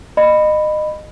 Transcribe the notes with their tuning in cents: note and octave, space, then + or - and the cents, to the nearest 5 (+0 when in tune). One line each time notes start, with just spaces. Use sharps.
D#5 -25 B5 +5